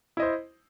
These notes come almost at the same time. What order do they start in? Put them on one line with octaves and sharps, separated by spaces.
E4 D#5 C5